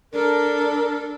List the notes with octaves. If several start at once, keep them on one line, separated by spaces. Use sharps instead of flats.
D4 A4 A#4